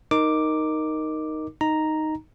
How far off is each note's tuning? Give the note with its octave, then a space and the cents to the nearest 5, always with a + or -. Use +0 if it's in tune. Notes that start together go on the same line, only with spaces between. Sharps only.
D#4 +0 A#4 +0 D6 +0
D#4 +0 A#5 +0